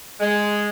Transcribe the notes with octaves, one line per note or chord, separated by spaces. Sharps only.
G#3